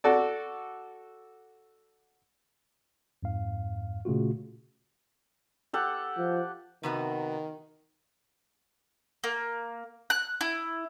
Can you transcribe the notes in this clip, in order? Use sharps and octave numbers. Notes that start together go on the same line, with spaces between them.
F#4 A4 D5
F2 G#2 F5
A#2 C#3 A3 F4 F#4
G4 A4 F#5
F3
C3 D#3 B3 F#4
A#3
F#6
E4